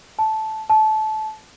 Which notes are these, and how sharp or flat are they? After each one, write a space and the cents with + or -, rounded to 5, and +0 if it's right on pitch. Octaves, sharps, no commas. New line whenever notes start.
A5 -10
A5 -25